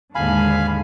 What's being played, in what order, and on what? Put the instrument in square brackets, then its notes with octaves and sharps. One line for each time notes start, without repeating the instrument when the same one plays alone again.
[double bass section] D#2 G#2 [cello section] D3 G#3 [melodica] F5 G#5 B5